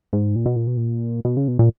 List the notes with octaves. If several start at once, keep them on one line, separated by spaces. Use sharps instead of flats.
G#2
A#2
B2
A#2
B2
A#2
B2
C#3
B2
A#2